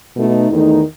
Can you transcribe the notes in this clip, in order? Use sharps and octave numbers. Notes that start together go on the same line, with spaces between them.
B2 A3 D#4
E2 D#3 A3 D#4